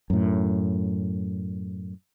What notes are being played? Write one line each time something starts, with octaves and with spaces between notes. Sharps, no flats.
F#2 A2